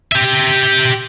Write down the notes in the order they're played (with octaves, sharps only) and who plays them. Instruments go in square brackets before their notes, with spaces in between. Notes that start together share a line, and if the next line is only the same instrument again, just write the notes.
[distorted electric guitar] G4 E5